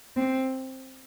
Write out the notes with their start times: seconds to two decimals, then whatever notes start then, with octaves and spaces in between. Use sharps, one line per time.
0.16 C4